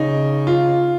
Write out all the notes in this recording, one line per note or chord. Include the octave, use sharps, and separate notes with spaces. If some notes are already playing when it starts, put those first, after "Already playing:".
Already playing: C#3 D#4
F4